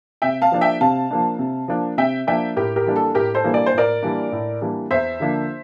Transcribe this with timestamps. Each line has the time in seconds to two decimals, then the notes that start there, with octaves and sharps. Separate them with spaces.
0.22 C3 E5 G5
0.42 F5 A5
0.52 F3 A#3 D4
0.61 E5 G5
0.81 C3 F5 A5
1.11 F3 A#3 D4
1.39 C3
1.68 F3 A#3 D4
1.98 C3 E5 G5
2.27 F3 A#3 D4 E5 G5
2.56 A2 G4 A#4
2.76 G4 A#4
2.86 E3 G3 A#3 D4
2.96 A4
3.15 A2 G4 A#4
3.34 A4 C5
3.44 E3 G3 A#3 D4
3.54 D5
3.66 C5
3.73 A2 A#4 D5
4.03 E3 G3 A#3 D4
4.32 A2
4.61 E3 G3 A#3 D4
4.91 E2 C5 E5
5.20 D3 F3 A#3 D4